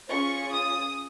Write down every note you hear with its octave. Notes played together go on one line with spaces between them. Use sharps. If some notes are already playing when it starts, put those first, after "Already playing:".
C#4 F4 G#4 C#6
D#6